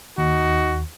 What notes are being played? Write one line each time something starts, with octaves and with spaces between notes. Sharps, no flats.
D#2 D#4 F#4